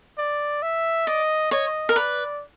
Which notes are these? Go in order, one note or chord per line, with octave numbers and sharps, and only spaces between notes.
D5
E5
D5 D#5
C#5 D#5
A#4
B4 D5